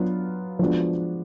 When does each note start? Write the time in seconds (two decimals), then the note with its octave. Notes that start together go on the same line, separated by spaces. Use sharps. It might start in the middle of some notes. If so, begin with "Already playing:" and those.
Already playing: F#3 B3 D4 F4
0.59 F3 G#3 B3 D4 F#4